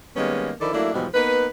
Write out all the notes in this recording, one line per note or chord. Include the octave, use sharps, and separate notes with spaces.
D#3 G3 G#3 A#3 B3 C#4
D3 D#3 F3 E4 A4 D5
F#3 A3 A#3 D4 E4
G#2 B2 E3 F3 G3 G#3
A#3 B3 D#4 B4